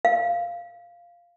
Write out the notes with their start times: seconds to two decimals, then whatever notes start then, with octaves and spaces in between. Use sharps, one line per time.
0.05 F5